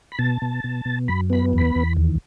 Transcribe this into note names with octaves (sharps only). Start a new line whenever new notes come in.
B5
B2 A5
B2
B2
B2
F#2 B5
B3 B5
E2 B5
E2
D#2